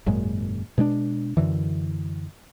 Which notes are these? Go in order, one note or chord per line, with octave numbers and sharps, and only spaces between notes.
G#1 F#2 A#2 G#3
B2 G#3 B3 D4
F#2 D3 E3